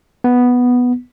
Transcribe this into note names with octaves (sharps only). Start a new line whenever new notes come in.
B3